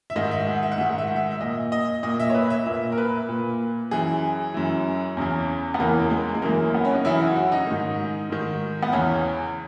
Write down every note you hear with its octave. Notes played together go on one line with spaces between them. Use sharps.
E5
G#2 D#3 D#5
E5
F#5
E5
F#5
G#2 D#3 E5
F#5
E5
F#5
E5
E5
A#2 D#5
D#5
A#2 D#5
E5
C#5
B4
E5
A#2 E5
A#4
B4
A#2
F#2 E3 G#4
F#2 E3
E2 C#3 E3
B3
E2 C#3 E3 A#3
A#3
G#3
G#3
F#2 C#3 E3 A#3
B3
C#4
D#4
F#2 C#3 E3 E4
F#4
F#4
D#4
G#2 D#3
G#2 D#3
B3
E2 C#3 E3 C#4